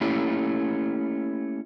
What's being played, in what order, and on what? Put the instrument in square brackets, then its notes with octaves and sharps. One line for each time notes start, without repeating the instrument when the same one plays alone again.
[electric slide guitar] A3 A#3 C#4 E4 G4